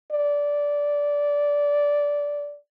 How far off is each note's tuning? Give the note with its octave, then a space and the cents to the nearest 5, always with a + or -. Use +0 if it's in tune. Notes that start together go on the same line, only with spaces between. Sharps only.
D5 -15